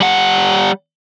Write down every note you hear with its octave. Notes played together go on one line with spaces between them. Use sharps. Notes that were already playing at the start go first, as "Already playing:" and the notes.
G3 F#5